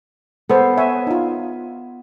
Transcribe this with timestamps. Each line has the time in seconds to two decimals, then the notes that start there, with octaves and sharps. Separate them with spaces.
0.50 B3 A4 C5
0.77 C#5 E5 G#5
1.07 D#4 F4